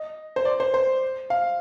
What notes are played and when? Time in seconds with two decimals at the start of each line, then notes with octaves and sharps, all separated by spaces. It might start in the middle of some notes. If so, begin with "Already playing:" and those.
Already playing: D#5
0.36 C5
0.45 D5
0.60 C5
0.74 C5
1.30 F5